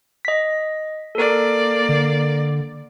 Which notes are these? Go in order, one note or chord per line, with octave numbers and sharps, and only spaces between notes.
D#5 B6
A#3 A4 A#4 D5
D3